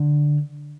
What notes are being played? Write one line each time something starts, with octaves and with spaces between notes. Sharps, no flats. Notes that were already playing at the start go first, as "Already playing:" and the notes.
Already playing: D3